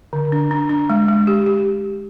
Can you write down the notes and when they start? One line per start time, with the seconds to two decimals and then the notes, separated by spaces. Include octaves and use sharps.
0.13 D3
0.32 D4
0.51 D4
0.69 D4
0.90 G#3
1.08 G#3
1.27 G4
1.46 G4